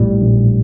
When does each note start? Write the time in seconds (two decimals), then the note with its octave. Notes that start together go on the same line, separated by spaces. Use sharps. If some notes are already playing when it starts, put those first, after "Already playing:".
Already playing: A#1 A2 G3
0.20 A#1